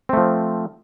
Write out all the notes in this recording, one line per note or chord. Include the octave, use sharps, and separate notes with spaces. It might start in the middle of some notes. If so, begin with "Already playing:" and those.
F3 A3 C4